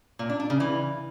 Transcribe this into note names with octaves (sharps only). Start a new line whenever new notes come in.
A#2
D4
D4
C#3
E3